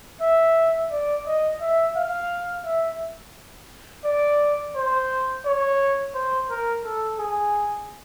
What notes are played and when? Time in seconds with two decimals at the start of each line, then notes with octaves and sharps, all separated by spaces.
0.21 E5
0.91 D5
1.27 D#5
1.61 E5
1.96 F5
2.65 E5
4.05 D5
4.76 C5
5.46 C#5
6.14 C5
6.50 A#4
6.84 A4
7.19 G#4